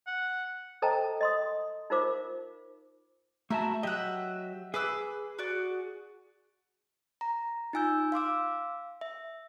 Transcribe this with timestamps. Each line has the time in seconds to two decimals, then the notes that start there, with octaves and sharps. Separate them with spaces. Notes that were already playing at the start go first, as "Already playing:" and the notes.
0.07 F#5
0.82 A4 C5 D#5 G5 A5 A#5
1.21 D#5 C6 D#6
1.90 D#4 F4 A#4 C5 F5 D6
3.50 A3 E4 F#4 A#4 E5 A5
3.83 F#3 G4 D#5 E5 F#5
4.74 G#4 B4 D6 E6
5.39 F#4 D5
7.21 A#5
7.73 D#4 F4 G#5 E6 G6
8.12 F5 C6 D6 E6
9.01 E5